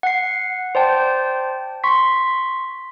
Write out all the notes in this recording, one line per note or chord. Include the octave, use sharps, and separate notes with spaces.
F#5 C7
C5 D5 G5 A5
C6 C#6 B6